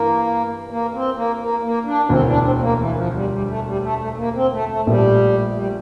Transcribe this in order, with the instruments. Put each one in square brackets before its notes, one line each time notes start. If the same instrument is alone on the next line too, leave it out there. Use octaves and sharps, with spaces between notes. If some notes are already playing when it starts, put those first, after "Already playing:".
Already playing: [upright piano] G2 E3 [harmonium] A#3
[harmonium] A#3
C4
A#3
A#3
A#3
D4
[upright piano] E1 D2 D3 [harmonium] C4
[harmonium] D4
C4
C4
A#3
E3
F3
G3
G3
A3
G3
A3
A3
A3
A#3
C4
A3
A3
[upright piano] A#1 A#2 F3 A3 [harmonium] G3
[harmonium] G3